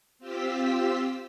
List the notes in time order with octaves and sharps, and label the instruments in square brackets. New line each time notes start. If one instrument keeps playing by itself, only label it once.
[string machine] C4 F4 G4 E6 B6